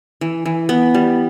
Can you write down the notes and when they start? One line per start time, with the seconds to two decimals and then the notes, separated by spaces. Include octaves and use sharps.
0.21 E3
0.46 E3
0.69 B3
0.94 G3